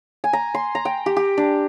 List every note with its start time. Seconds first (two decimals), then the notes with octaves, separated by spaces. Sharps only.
0.24 G#5
0.33 A#5
0.54 C6
0.75 A#5
0.85 G5
1.06 G4
1.16 G4
1.37 D4